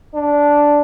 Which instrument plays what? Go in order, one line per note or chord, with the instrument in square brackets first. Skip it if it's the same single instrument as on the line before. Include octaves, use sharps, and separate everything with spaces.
[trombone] D4